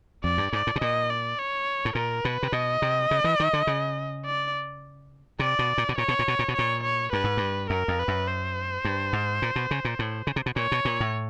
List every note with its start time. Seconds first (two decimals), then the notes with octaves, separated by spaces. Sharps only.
0.24 F2 D5
0.38 G2
0.52 G#2 D5
0.67 A2
0.76 B2
0.81 A#2 D#5
1.10 D5
1.39 C#5
1.85 A2
1.95 A#2 A#4
2.24 B2 B4
2.43 C3
2.52 B2 D#5
2.82 C3
3.11 C#3
3.24 E3
3.40 D#3
3.53 D3
3.67 C#3
4.25 D5
5.39 C3 D5
5.59 B2
5.78 A#2
5.89 B2
5.98 A#2 C#5
6.08 B2
6.19 A#2
6.28 B2
6.39 A#2
6.48 B2
6.55 A#2 C#5
6.83 C#5
7.12 G2 B4
7.24 G#2
7.37 G2
7.70 F#2 A#4
7.88 F2
7.99 B4
8.08 F#2
8.27 C5
8.85 G2
9.13 G#2
9.42 A#2
9.56 B2
9.71 C#3
9.85 A#2
9.99 A2
10.27 C#3
10.36 C3
10.46 B2
10.56 A#2 C#5
10.72 B2
10.85 A#2
11.00 A2